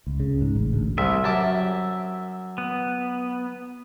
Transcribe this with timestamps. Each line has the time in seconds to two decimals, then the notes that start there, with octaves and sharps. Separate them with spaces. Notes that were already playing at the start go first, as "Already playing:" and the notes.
0.07 C#2
0.20 C#3
0.41 G#2
0.56 A1
0.73 D2
0.98 C2 E5
1.24 F#2 A5 D6
2.58 B3